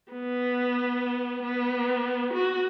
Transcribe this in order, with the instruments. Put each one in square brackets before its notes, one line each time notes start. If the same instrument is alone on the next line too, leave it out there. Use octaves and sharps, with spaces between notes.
[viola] B3
B3
F#4